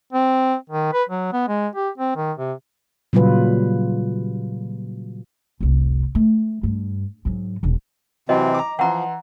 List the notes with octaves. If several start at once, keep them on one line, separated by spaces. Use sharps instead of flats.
C4
D#3
B4
F#3
B3
G#3
G4
C4
D#3
C3
A#2 C#3 F#3 G3 F4 B4
F1 C2
A3
G2
G#2 F#3
E1 B1
C3 E3 F#3 C4 F#4 D#5
A#5 D6
E3 F3 F#5 A#5 C6